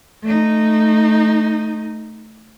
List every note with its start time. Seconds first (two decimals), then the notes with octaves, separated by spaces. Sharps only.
0.22 A3 D#4